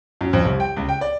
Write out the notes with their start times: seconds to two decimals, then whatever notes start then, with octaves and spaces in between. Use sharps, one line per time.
0.21 F#2
0.33 F2
0.45 C2
0.60 G5
0.76 C#2
0.89 G5
1.01 D5